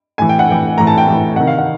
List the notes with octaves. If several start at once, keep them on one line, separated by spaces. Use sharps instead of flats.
A2 E3 G#5
G5
F#5
A2 E3 G5
A2 E3 A#5
A5
G5
A2 E3
C3 D#3 F#5
F5
F#5